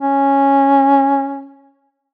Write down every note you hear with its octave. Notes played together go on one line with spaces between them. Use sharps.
C#4